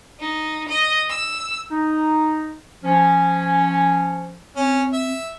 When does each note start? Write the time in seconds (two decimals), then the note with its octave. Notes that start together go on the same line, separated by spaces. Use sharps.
0.20 D#4
0.69 D#5
1.09 E6
1.71 D#4
2.84 F3 C#4
4.56 C4 C#4
4.93 E5